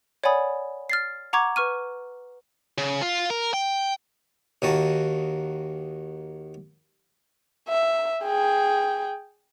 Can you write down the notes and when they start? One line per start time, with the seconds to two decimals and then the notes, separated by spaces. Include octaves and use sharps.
0.24 C#5 D5 F#5 G#5 B5 D#6
0.90 F6 A6 C7
1.33 F#5 A#5 C#6 D6 G#6
1.56 B4 C#6 F6 D#7
2.78 C#3
3.01 F4
3.30 A#4
3.54 G5
4.62 D#2 D#3 F#4 A5
7.68 E5
8.24 G#4 G5